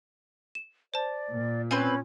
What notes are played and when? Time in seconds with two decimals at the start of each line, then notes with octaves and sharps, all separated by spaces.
0.55 E7
0.94 C5 D5 A5
1.32 A#2
1.71 C4 C#4 B4 G#5 C6